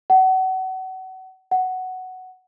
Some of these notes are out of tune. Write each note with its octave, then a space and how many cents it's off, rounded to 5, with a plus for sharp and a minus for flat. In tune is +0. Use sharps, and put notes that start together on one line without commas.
F#5 +30
F#5 +5